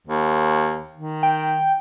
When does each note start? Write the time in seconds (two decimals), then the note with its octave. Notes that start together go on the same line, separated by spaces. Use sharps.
0.07 D#2
0.94 D#3
1.23 G5